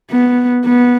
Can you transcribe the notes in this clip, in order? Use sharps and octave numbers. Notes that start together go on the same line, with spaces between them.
B3
B3